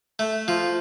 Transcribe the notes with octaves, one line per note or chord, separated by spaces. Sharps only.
A3
F3